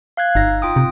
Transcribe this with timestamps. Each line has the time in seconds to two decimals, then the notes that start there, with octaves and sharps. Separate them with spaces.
0.17 F5 F#6 G#6
0.35 G1 D#4 A#6
0.62 F4 G5 D#6
0.76 C3